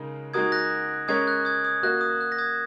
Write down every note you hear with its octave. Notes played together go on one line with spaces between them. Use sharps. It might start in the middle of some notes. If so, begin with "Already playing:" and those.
Already playing: C#3 G#3 D#4 A#4
G#3 D#4 F#4 A#4 D#6 G#6
F#6 A#6
G#3 C#4 A#4 C#5 D#6 G#6
F#6
D#6 G#6
D#6 G#6
A#3 F#4 D#5 F#6
D#6
F#6
A#6
D#6 G#6